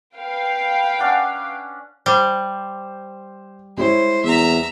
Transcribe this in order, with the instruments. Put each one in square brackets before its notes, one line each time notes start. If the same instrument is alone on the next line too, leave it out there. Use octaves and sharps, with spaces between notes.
[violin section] B4 F5 G5
[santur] C#4 D4 F#5
[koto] G3 [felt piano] C5
[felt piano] G#3 E4 C#5 [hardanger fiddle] C5
[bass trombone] E2 [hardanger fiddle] E5 A#5